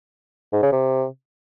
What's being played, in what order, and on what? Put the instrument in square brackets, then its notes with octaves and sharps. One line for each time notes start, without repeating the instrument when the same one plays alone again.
[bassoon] G#2
C#3
C3